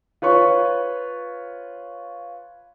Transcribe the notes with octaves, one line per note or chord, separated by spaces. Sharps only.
F4 B4 C#5 C#6